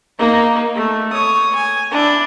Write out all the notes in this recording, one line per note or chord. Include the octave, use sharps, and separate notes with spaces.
A#3 D#4
A3
C#5 D#6
G#5
D4 E4